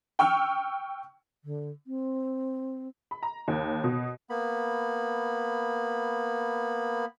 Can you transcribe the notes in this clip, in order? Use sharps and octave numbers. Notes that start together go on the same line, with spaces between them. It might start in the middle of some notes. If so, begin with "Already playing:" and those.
G5 C#6 E6 F6
D3
C4
B5
A#5
D#2
B2
A#3 B3 B5